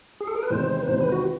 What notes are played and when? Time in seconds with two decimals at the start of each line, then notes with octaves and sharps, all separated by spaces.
0.20 G#4
0.27 A4
0.36 A#4
0.43 B4
0.50 E2 C3 D#3 G#3 C5
0.82 B4
0.87 E2 C3 D#3 G#3 C5
1.00 B4
1.12 F#4